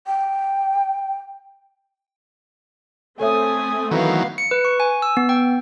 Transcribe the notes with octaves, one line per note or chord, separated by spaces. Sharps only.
G5
A3 C4 A4 C#5 E5 G#5 D#6
D#3 E3 F#3 B3 F5
C#7
B4
C#6
G#5
E6
B3
G5